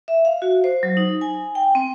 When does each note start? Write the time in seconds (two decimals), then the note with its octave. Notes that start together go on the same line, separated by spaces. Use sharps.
0.08 E5
0.25 F5
0.42 F#4
0.64 C5
0.83 F#3
0.97 D#4
1.21 G#5
1.55 G5
1.75 C4